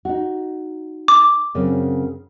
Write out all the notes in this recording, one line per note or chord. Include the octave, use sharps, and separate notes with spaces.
D#4 F#4
D6
F#2 C#3 C4